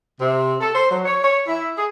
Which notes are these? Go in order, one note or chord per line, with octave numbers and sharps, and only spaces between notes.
C3
A4
C5
F#3
C#5
C#5
E4
G#4